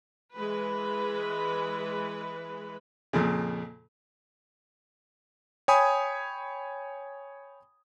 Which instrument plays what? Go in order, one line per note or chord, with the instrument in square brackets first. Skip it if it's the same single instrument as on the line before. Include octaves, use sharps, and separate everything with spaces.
[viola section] E3 G#3 B4
[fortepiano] F2 A#2 C#3
[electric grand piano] C#5 G5 G#5 B5 D#6